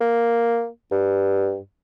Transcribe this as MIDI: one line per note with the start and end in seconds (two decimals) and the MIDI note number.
0.01 0.67 58
0.92 1.58 43